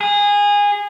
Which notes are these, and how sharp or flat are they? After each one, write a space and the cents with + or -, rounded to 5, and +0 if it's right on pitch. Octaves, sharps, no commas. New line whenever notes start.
G#4 -20